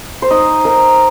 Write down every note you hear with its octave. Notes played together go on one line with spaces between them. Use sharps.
C5
D#4 D#5
D#4 A#4